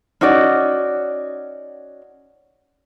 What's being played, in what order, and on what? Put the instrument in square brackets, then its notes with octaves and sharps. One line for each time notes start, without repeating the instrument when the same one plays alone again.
[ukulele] C#4 D#4 F#4 D5